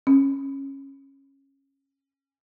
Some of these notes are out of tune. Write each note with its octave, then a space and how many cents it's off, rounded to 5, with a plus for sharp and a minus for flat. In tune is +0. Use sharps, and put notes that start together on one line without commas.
C#4 -15